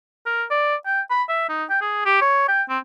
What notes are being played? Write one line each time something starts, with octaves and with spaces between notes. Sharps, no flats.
A#4
D5
G5
B5
E5
D#4
G5
G#4
G4
C#5
G5
C4